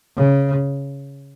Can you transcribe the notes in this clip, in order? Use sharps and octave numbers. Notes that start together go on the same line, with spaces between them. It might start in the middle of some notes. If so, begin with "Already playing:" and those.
C#3